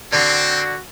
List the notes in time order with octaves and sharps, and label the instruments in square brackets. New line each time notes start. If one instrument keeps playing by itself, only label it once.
[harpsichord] D3 [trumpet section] C4 [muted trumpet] F#4